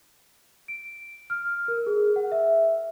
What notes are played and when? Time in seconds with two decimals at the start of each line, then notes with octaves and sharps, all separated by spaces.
0.68 D7
1.30 F6
1.68 A#4
1.87 G#4
2.16 F#5
2.32 E5